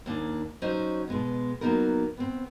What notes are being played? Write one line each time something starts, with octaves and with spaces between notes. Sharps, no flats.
D#2 A#3 D4
F#3 C#4 D#4 C5 D#5
B2 G#3 B3
F#3 A#3 B3 D#4 A#4
B3 C4